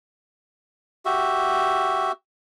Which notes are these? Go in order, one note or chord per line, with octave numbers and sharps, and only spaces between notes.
F#4 G4 E5